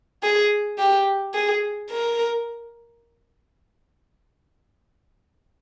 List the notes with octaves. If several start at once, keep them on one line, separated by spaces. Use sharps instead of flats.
G#4
G4
G#4
A#4